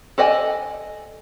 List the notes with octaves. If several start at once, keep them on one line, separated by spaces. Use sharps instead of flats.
A4 D5 D#5 G5 G#5